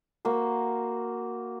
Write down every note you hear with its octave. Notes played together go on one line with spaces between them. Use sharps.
A#3 F#4 C5